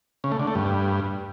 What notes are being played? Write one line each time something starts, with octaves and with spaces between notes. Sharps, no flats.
C#3
A3
D3
A3
G2